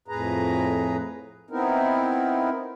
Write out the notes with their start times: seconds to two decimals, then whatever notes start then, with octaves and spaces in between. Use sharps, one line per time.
0.08 F2 A2 G#4 B4 A#5
1.50 B3 C4 D#4 E4 A#4